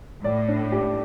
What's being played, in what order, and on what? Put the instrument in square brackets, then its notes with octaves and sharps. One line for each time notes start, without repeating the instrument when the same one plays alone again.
[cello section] A2 [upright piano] D5
[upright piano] D4
G4